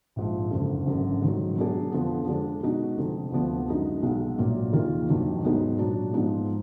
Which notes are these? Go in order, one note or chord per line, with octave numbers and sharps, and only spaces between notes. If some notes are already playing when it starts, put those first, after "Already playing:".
A#1 G#2 F3
F#1 F2 D3
G#1 F#2 D3
G#2 D#3 F#3
B2 F#3 D4 G#4
F2 D3 F3 B3
F2 D3 G#3 D4
B2 G#3 D#4 F#4
F1 F2 D3
D2 D3 F3 B3 D4
F#2 D3 G#3 D#4 F#4
B1 B2 G#3 B3
A#1 A#2 F#3 A#3
D#2 D#3 A#3 F4 G#4
F1 D#2 D#3 F#3 D4
G#2 F#3 B3 D#4 G#4
A#2 F#3 D4 F#4
G#2 F3 G#3 B3 D#4